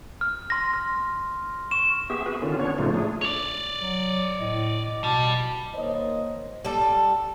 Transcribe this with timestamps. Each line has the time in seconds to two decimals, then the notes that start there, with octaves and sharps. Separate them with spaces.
0.21 F6
0.50 C6 A#6
0.73 F6
1.71 C#6 E7
2.10 B3 G4 G#4 E5
2.26 F#4 G#4 B4
2.42 D3 D#3 C#4 F4
2.59 B3 C#4 D4 C#5
2.78 A2 C#3 F3 A3 D#4 F4
2.94 A3 D4 G#4
3.21 C#5 D5
3.81 F#3
4.39 A2 D#5
5.04 B2 G3 A5
5.75 D#3 A#3 C5 C#5 D#5
6.65 G3 A4